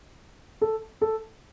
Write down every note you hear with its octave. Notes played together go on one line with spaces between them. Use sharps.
A4
A4